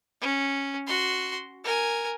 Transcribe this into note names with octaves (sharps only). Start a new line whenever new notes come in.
C#4
F#4 C6
A#4 G#5